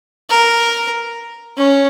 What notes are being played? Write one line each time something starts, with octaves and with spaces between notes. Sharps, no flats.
A#4
C#4